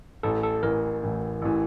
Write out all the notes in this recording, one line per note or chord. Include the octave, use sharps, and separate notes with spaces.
A1 A2 E3 A4
A4
A1 A2 E3 A#4
A1 A2 E3
A1 A2 E3